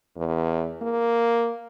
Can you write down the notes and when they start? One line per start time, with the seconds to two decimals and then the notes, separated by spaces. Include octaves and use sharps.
0.17 E2
0.82 A#3